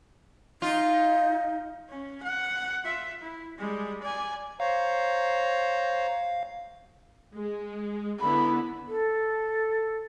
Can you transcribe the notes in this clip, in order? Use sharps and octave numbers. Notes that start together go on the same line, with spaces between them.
D#4 F4
C#4
F#5
F4 E5
E4
G3 G#3
D5 G#5
C5 C#5 F5 A#5
G#3
D3 B3 E4 B5
A4